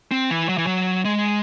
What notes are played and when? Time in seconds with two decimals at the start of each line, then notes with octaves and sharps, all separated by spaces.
0.11 C4
0.31 E3
0.49 F#3
0.58 E3
0.67 F#3
1.05 G#3